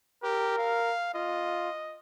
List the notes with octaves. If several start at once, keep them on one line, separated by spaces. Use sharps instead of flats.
G4 A#4
F5
F4 D#5